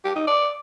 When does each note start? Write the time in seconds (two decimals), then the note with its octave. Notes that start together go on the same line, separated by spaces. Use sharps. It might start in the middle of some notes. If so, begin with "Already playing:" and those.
0.05 G4
0.16 D#4
0.27 D5